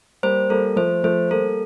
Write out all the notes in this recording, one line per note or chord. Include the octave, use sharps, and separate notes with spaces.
G3 A#3 C5
G3 A#3 A4
F3 A3 C5
F3 A3 C5
G3 A#3 A4